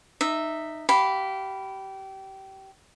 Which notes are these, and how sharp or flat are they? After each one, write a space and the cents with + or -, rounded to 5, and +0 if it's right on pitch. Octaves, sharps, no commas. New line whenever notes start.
D#4 -20 E5 +0
G4 -25 F5 -10 B5 +0